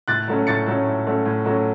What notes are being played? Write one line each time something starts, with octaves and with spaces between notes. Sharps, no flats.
A2 F#6 A6
F#3 A3 C#4
A2 A6 C#7
F#3 A3 C#4
A2
F#3 A3 C#4
A2
F#3 A3 C#4